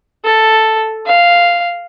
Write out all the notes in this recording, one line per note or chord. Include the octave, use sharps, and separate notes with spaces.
A4
F5